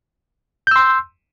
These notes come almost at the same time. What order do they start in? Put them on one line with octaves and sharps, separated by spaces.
G6 E6 C6